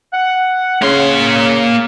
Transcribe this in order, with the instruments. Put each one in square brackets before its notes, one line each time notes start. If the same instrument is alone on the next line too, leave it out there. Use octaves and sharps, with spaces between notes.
[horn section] F#5
[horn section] C#3 [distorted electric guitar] A#3 C6